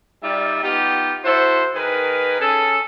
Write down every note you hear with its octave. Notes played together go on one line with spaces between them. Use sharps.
G3 D#4 F4 D5 E5
B3 D#4 F4 G4
E4 F#4 A4 C5
D#3 G#4 A#4 B4
C#4 G#4 A4